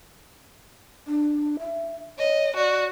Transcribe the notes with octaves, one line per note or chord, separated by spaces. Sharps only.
D4
E5
C#5 D#5
F#4 D5